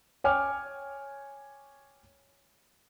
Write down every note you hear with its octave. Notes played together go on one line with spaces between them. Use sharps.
C#5 G5 G#5 D6 F6